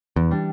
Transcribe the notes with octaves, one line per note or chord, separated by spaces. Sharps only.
E2 E3
G3 D4